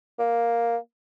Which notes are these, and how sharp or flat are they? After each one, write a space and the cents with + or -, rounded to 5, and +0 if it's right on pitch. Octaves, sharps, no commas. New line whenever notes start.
A#3 +5